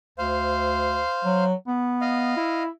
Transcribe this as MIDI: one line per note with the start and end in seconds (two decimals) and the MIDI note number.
0.18 1.02 38
0.18 1.44 72
0.18 1.44 77
1.25 1.54 54
1.67 2.36 59
2.01 2.63 75
2.01 2.63 77
2.37 2.69 64